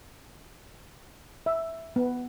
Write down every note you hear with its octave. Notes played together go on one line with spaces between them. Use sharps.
E5
B3